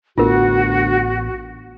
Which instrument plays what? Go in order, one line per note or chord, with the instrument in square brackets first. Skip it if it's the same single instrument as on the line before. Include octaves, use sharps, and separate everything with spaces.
[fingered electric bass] A1 B3 [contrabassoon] D2 [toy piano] F4 A#4 [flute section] F#4